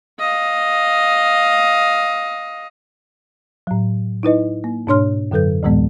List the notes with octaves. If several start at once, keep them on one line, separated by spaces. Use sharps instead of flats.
D#5 F5
A2 F#3
D#4 E4 B4 D#5
A#3
G#2 B2 D4 C#5 C6 F6
F#2 D3 F#3 A4 B4 G6
D2 A2 E3 G#3 B3